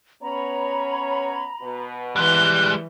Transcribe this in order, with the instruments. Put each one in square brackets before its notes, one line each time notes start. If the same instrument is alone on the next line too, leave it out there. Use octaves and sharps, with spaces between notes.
[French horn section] B3 C#4 C#5 [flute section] A#5 B5
[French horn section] B2 B4
[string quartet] E3 G6 [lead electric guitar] G3 G#3 [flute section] F#6